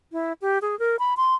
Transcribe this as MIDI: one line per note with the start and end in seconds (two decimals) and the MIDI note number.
0.12 0.33 64
0.42 0.58 67
0.62 0.78 68
0.79 0.96 70
0.99 1.14 83
1.17 1.35 84